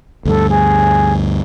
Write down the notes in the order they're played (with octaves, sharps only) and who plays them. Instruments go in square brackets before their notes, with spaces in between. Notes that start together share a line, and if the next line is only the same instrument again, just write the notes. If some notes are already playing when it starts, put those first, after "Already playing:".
[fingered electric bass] D2 G2 [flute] A4
[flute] G#4